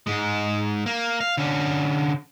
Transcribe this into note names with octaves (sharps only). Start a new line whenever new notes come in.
G#2 G#3
A#3
F5
D3 C#4